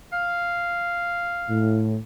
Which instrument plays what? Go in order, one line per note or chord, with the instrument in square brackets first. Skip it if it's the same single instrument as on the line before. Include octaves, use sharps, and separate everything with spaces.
[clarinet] F5
[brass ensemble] A2